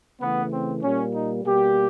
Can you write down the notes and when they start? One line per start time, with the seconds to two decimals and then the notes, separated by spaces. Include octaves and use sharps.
0.20 C#3 E3 A3 B3
0.52 C4
0.82 A#2 G3 A#3 C#4
1.12 D#4
1.44 B2 G3 A#3 G4